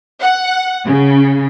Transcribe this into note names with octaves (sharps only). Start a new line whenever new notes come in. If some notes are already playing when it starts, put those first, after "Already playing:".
F#5
C#3